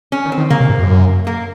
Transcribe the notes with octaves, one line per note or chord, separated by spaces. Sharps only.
C#4
D#3
C4
D#3
C#3 A#3
C3
G#2
F#2
A#3